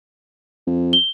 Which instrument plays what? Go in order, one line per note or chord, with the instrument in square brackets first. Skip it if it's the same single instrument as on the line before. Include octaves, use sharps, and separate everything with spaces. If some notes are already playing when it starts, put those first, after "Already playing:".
[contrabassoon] F2
[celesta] G7